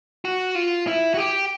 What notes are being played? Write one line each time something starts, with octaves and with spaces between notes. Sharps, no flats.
F#4
F4
E4
F#4
G4